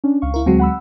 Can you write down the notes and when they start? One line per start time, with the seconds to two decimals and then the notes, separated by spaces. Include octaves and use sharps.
0.04 C#4 D4
0.22 C#2 F5 C#6
0.34 E4 A#4
0.46 D2 F#3 G#3 C4 F#4
0.59 F#5 B5 E6